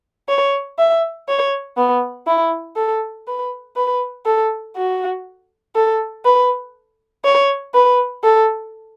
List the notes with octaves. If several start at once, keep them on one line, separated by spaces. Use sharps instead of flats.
C#5
E5
C#5
B3
E4
A4
B4
B4
A4
F#4
A4
B4
C#5
B4
A4